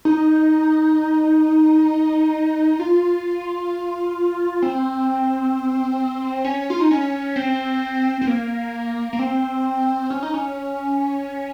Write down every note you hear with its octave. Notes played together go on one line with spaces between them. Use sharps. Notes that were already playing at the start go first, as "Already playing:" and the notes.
D#4
F4
C4
C#4
F4
D#4
C#4
C4
C4
A#3
A#3
C4
C#4
D#4
C#4